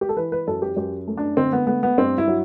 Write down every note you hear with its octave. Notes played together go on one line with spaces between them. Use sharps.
G4
A4
E3 B4
B4
F#2 A4
G4
F#2 G4
A3
D4
D3 C4
B3
A3 B3
B3
G2 C4
E4
F#3